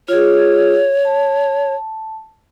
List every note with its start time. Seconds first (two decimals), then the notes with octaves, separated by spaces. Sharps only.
0.08 F4 G#4 C#5
1.05 A5